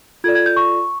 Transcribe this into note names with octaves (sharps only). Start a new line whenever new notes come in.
F4 A4 D5 G#6
G#6
G6
C#6